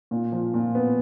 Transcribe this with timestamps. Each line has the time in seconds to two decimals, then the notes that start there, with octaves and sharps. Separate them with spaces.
0.11 A#2
0.32 F3
0.54 A#2
0.75 B3